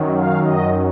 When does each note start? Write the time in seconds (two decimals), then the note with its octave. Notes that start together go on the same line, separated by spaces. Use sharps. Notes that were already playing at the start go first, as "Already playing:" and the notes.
Already playing: F#2 D#3 F#3
0.16 F5
0.44 D#5